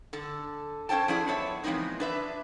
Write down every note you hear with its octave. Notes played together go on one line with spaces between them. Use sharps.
D3 A4
C#4 A4 C5 G5 A5
F3 C#4 D4 E4 G#4
B3 C#5 E5
E3 F3 G#3 B3 C4 D#4
D4 B4 E5